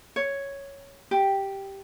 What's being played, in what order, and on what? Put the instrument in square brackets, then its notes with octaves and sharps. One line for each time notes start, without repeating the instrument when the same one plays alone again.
[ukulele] C#5
G4